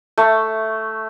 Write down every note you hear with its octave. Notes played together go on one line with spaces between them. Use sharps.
A3